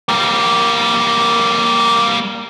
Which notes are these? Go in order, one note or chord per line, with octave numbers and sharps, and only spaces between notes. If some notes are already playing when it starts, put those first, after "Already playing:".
G3 A#3